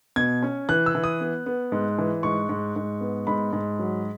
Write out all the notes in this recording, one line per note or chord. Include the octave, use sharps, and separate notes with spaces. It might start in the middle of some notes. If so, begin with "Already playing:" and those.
B2 G#6
C#4
E3 F#6
E6
E3
D#6
B3
B3
G#2
E3
G#2 C#6
G#2
G#2
B3
G#2 B5
G#2
F#3